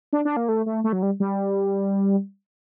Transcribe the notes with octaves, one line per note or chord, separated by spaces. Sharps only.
D4
D4
A#3
A3
A3
A3
F#3
G3
G3